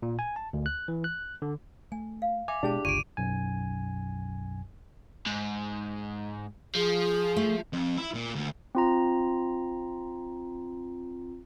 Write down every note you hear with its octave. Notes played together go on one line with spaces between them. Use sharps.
A#2
G#5
A5
D2
F#6
E3
F#6
D3
A3 G#5
F5
E5 G5 G#5 D6
B2 G#3 D4 E4 G4 G#4 A5
G1 C#2 F4 D5 C#6 D7 D#7
B1 F#2 G#5
G#2
F3 G#4
A3
F2
E4
A#2
D2
C4 F4 A#5